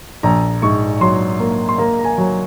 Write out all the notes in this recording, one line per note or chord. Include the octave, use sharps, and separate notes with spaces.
A#1 A#5
G#2 C#6
F#3 C6
A#3
C6
A#3 A#5
A#5
G#5
F#3